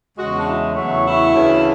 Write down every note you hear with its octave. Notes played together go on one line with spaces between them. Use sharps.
E2 C#3 G#3 F#4
D4
E4
E2 C#3 F#3 A3
E4
D2 C#3 E3